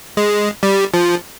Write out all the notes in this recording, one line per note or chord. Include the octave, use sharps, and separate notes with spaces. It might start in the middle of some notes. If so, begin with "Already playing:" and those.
G#3
G3
F3